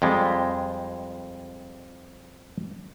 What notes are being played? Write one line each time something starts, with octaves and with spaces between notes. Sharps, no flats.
F2 G3 G#3